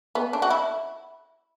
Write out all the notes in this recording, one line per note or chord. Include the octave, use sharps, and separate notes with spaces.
B3
D4
F#4
E4